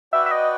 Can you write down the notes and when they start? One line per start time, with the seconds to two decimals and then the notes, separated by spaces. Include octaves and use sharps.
0.13 F#4 B4 D5 E5 G5
0.26 E5
0.31 D#5